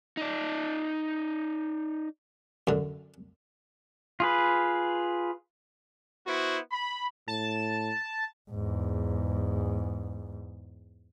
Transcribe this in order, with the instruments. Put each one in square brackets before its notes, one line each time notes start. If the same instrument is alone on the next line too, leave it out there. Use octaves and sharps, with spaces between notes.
[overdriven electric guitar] D#4 D5
[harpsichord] F#2 D3
[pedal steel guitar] F4 G#4 B4
[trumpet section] B3 E4 F#4 C5
B5
[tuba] A2 [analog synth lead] A5
[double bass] E2 G#2